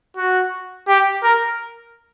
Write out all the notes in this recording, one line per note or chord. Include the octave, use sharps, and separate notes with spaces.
F#4
G4
A#4